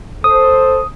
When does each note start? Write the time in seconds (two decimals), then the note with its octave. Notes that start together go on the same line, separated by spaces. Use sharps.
0.24 A4 C5 D#6